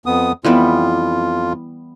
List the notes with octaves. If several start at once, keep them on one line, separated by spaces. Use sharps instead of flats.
F2 B3 D#6
F2 E3 G3 B3 F4